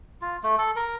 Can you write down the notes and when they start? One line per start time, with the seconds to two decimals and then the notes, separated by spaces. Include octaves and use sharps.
0.22 F4
0.43 A3
0.58 A4
0.76 A#4